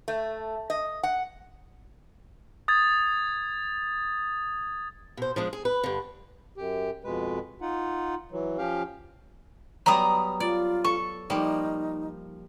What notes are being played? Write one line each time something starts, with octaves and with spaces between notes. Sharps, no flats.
A3
D#5
F#5
D#6 G#6 A6
B2 C5
F3 G#3 D4
G#4
B4
G2 D3
F#2 G4
F2 B2 G#3 B4
D#4 F4 F#5
E3 F#3
F3 C#4 G4 F5
F#3 G3 B3 A#5 D#6
F4 D5
A4 C#6
F3 G3 A#3 D#4